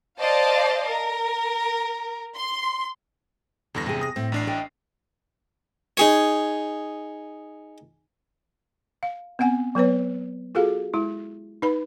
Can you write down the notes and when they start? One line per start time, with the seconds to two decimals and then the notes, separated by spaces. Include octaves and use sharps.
0.20 C5 D5 D#5 F5 A5
0.87 A#4
2.36 C6
3.75 E2 G2 D3 A#6
3.86 C3 G#4
4.01 D#6 A#6
4.16 A2 C4
4.32 A1 D4 C7
4.47 D#5 G5
5.97 D#4 G#4 C#5
9.03 F5
9.39 B3 C4 F#5 G#5
9.75 F#3 B3 B4 C#5
10.55 F4 F#4 G#4 A4 F5
10.94 G#3 E4
11.62 D#4 B4 B5